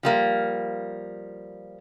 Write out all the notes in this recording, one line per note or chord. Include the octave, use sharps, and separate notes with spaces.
F3 G3 A#3